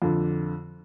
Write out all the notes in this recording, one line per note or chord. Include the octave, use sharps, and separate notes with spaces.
F2 D3